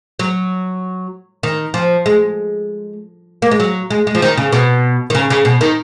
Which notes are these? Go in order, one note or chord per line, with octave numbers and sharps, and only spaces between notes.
F#3
D#3
F3
G#3
A#3
G#3
F#3
G#3
G#3
F3
D#3
C#3
B2
D#3
C#3
C#3
B2
D#3